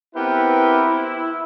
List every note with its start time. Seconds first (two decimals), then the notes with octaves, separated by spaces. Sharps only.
0.15 B3 C4 E4 G4 A#4 B4
0.87 E4